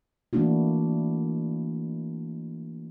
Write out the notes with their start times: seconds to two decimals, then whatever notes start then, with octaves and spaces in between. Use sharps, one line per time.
0.33 E3 A3 A#3 D4 E4 F#4